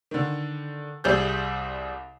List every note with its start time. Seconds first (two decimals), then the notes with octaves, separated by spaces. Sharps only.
0.11 D3 D#3
1.04 C2 G3 G#4 E6 G6